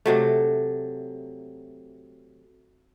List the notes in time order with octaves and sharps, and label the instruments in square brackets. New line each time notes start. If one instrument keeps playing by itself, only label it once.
[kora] C3 F#3 A3